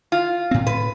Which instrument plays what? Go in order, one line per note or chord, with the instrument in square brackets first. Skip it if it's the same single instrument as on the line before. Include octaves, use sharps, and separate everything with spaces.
[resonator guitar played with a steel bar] F4
[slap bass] A2 C4
[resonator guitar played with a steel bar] B4